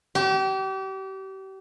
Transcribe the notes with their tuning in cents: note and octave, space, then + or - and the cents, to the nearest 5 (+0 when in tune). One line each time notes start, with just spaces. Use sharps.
G4 -35